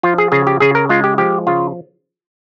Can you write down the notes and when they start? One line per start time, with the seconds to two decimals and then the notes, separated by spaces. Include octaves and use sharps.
0.03 F3 F4
0.18 G#4
0.32 C#3 G#4
0.47 G4
0.60 C#3 G#4
0.75 A#4
0.89 G#3 F4
1.04 G4
1.18 F3 G4
1.47 C#3 F4